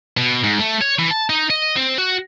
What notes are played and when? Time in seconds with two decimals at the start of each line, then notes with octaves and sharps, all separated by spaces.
0.17 B2
0.44 G#2
0.59 A3
0.81 C#5
0.99 E3
1.11 A5
1.30 D#4
1.50 D#5
1.76 C4
1.98 F#4